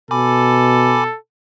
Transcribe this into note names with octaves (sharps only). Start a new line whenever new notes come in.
B2 A4 G#5 B5 D6